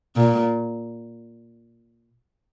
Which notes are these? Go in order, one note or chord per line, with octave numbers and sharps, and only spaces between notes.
A#2